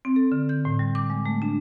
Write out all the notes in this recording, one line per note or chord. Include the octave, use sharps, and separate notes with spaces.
C4
A4
D3
G6
A2
G3
D6
G#3
A3
D4